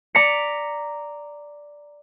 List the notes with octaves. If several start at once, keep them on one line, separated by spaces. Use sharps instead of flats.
D5 A#5 B6 C#7